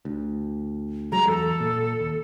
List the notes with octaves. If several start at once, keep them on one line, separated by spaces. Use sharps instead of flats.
D2
F#3 G#3 A#5
E2 A4
A#2
D#2